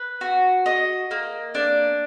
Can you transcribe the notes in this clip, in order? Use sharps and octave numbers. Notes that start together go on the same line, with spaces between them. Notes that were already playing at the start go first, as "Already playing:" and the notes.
Already playing: B4
F#4
D#5
A#3
D4